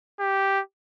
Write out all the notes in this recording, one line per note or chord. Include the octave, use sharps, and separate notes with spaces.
G4